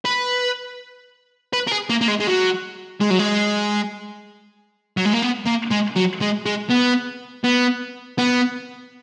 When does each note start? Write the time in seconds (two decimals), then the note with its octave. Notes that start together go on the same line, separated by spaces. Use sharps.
0.05 B4
1.53 B4
1.68 A#4
1.72 G#4
1.90 A#3
2.01 A#3
2.08 G#3
2.20 G#3
2.28 F#3
3.00 G#3
3.10 F#3
3.19 G#3
4.97 F#3
5.06 G#3
5.14 A#3
5.23 B3
5.47 A#3
5.71 G#3
5.96 F#3
6.21 G#3
6.46 G#3
6.70 B3
7.44 B3
8.18 B3